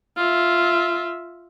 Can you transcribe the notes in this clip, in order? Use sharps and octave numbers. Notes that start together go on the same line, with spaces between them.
F4 E5